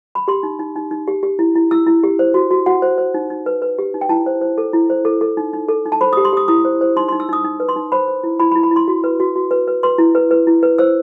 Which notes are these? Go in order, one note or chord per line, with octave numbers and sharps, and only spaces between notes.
B5
G4 C6
D#4
D#4
D#4
D#4
G4
G4
E4
E4
E4 E6
E4
G4
C5
F#4
F#4
F#4 F#5
C5
C5
D#4
D#4
B4
B4
G4
D#4
G5
E4 A5
C5
C5
A4
E4
C5
A4
A4
D#4
D#4
A4
D#4
A5
C5 B5
D#6
G4
C6
G4 D#6
E4 D#6
C5
C5
D#4 C6
C6
D#4
E6
D#4 D#6
D#4
B4
C6
D#4
C5 B5
C5
E4
E4 B5
B5
E4
B5
E4 C6
F#4
B4
F#4
F#4
B4
B4
B4 C6
E4
B4
B4
E4
B4
C5 E6